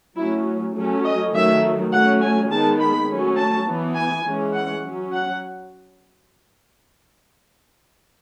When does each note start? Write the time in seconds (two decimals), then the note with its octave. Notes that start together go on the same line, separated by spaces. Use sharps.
0.17 F#3 A3 C#4 E4
0.75 F#3 A3 C#4 G#4
1.04 D#5
1.33 D#3 F#3 A3 E5
1.92 F#3 A3 C#4 F#5
2.22 G#5
2.50 D#3 G#3 B3 A5
2.79 B5
3.08 F#3 A3 C#4
3.37 A5
3.66 E3 B3
3.95 G#5
4.24 E3 G#3 C#4
4.53 F#5
4.83 F#3 C#4
5.12 F#5